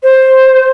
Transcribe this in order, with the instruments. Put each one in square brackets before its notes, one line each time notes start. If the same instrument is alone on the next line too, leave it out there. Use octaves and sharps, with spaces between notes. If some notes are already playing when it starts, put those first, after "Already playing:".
[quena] C5